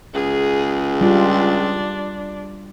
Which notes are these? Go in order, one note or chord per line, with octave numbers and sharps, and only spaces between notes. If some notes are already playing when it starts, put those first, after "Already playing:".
C#2 G#4
G3 D4 F4